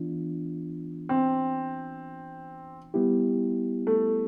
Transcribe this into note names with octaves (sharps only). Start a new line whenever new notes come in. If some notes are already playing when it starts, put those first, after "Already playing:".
Already playing: E3 B3 D4 F4
C4
G3 B3 E4 G4
A3